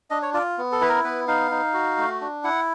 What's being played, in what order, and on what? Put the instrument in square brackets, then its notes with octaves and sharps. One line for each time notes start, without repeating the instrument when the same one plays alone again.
[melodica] D4 D#5
C#5
F4 D5
B3
A4
E4 B4
A#4
B3 B4
D#4 F5
D#4
F#4
A3
D4
E4 F#5